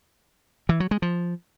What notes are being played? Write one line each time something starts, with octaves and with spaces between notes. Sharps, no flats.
E3
F#3
G#3
F3